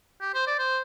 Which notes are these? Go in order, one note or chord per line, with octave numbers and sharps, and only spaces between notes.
G4
C5
D5
C5